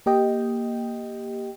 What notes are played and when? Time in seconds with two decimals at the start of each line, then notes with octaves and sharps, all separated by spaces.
0.06 A#3 G4 D#5 G5